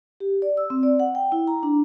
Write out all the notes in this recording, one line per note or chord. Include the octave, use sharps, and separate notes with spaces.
G4
D5
E6
C4
D5
F#5
G5
E4
A#5
D4